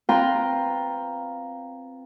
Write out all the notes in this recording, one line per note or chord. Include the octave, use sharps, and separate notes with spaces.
C4 F4 B4 G5 A#5 C6